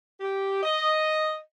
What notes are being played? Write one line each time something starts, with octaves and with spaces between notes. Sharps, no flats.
G4
D#5